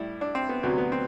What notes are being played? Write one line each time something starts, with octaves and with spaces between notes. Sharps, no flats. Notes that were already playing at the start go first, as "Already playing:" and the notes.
Already playing: A2 G3 E4
D4
C4
B3
D2 C3 F#3 B3
B3
C4